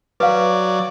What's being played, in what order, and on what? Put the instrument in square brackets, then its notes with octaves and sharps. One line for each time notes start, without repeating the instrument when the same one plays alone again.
[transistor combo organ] F#3 D5 [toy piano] B4 F5